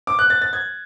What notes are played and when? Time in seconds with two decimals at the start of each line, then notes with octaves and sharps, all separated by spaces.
0.07 D6
0.19 F#6
0.30 A6
0.42 A6
0.53 G#6